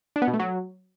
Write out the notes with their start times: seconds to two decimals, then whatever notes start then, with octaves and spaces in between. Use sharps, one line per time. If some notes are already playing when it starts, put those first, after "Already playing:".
0.16 D4
0.22 B3
0.28 B2
0.34 A3
0.39 F#3